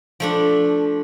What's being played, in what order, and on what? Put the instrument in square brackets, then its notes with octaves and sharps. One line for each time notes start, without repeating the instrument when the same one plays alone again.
[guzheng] F3 A3 D4